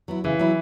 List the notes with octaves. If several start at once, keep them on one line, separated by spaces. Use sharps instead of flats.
F#3 B3 E4
C#3 E3
F#3 B3 E4